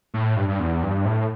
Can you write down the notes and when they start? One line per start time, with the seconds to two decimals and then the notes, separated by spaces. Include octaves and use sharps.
0.14 A2
0.37 G2
0.49 G2
0.60 E2
0.83 G2
1.05 A2